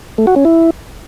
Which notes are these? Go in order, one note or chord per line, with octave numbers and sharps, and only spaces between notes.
A3
F#4
C#4
E4